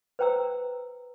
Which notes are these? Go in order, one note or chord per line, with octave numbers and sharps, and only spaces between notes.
B4 C5 G5 A#5 E6